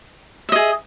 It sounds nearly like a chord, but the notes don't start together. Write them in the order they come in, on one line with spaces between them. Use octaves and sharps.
E5 D#5 G#4